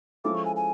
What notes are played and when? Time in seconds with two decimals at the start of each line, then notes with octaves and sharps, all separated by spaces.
0.24 F3 G#3 C#4 E4 A4 D6
0.35 C#6
0.45 G#5
0.56 G#5